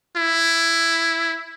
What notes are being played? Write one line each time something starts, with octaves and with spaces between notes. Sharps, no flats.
E4